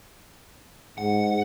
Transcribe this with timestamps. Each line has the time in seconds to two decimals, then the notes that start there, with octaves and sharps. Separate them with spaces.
0.98 G#2 F#5